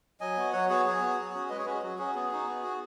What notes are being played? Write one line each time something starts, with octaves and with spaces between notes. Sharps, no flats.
F#3 D#5 G#5
B3 F#4
F#3 C#5 F#5
B3 F#4 G#4 C#5
F#3 G#4 C#5
B3 F#4
F#3
C#4 F#4
G#3 B4 D#5
G#4 C#5
C#4 F#4 B4
G#4
F#3 F#4
C#4 F#4 G#4
B3 G#4
D#4 F#4
B3
F#4